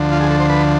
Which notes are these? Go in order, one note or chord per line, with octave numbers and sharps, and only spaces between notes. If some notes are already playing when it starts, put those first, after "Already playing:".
Already playing: D2 D3 F3
F4
G#4
A4
C5
B4